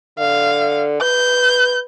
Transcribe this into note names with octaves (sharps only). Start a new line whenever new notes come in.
D3 F5
B4 G6